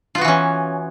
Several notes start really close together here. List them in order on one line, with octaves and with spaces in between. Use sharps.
F4 B3 F#4 E3 C#4